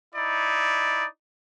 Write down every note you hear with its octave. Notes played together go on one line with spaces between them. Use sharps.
D#4 E4 D5